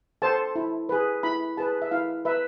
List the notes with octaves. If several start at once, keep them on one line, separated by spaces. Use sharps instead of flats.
A4 C5 A5
E4
G#4 B4
E4 B5
G#4 B4 A5
E5
E4 F5
B4 E5